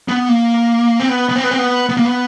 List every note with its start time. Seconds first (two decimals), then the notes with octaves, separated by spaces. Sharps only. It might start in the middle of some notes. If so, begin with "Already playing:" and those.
0.08 B3
0.29 A#3
1.00 C4
1.09 B3
1.29 B3
1.36 C4
1.44 B3
1.51 C4
1.58 B3
1.89 B3
1.97 A#3
2.05 B3